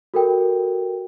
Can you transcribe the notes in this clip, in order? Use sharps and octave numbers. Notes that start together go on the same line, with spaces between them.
F#4 A4 A#4 G5